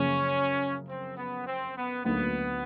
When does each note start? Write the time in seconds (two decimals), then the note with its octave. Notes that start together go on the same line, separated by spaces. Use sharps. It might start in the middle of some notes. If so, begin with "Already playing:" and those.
Already playing: F#2 C#3 F3 A#3 C#4
0.88 C4
1.17 B3
1.46 C4
1.76 B3
2.05 D2 D3 F#3 A#3 B3 D#4